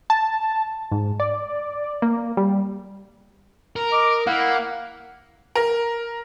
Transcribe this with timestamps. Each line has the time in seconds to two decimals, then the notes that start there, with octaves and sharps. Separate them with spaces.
0.10 A5
0.92 G#2
1.20 D5
2.02 A#3
2.37 G3
3.76 A#4
3.92 D#5 D6
4.27 A#3 E4 F5 F#5
5.55 A#4